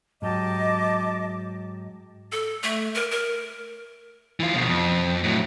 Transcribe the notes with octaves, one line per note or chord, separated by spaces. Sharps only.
G#2 F#3 G4 D#5 A5 D6
A4
A3
A#4
A#4
E3 F4
B2 F3
F2
A2 F#3